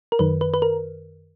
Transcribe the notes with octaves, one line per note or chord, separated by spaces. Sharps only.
A#4
F#2 D#3 B4
B4
B4
A#4